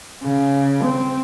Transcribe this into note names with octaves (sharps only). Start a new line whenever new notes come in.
C#3
C4